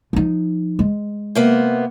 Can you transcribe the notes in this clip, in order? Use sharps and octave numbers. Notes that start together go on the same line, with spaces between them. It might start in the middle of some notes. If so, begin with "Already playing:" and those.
F3 D#4
G#3
C3 A#3 B3